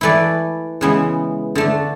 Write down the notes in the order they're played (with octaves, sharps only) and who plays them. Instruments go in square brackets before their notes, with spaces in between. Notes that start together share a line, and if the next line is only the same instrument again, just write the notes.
[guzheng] E3 A3 E4 B4 D5
C#3 E3 G#3 B3
D3 A3 D4